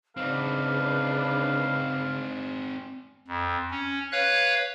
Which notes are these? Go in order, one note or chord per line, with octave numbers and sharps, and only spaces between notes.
C#3 C4 D4 D#4 B4 F5
F2
C#4
B4 C#5 F5 F#6